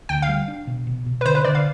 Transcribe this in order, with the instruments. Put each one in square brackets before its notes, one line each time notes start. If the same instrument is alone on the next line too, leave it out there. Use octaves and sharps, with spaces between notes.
[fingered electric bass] D2 [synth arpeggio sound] G5
[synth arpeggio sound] F5
[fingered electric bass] G3
D4
B2
B2
B2
[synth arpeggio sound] B4
[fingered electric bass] D3 [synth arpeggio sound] C5
[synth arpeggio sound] B4
[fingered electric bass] D3 [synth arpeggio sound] D5
[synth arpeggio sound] F5